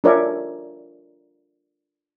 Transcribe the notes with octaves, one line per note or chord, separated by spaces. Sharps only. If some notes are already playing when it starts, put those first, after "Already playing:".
D4 F4 A#4 C#5 D5 E5